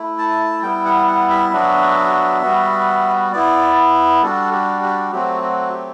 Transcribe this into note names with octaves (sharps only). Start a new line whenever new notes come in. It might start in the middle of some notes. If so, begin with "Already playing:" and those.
Already playing: A3 E4
A5
G3 B3 E4 G5
F#5
F#5
E5
F#3 B3 D4 F#4
G3 B3 F#4
B3 E4 D5
G3 D4 F#4 A4
G4
G4
F#3 A3 C4 F#4 G4
F#4
G4